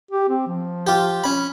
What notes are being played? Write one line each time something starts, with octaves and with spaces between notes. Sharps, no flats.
G4
C4
F3
F4 G4
C#4 B5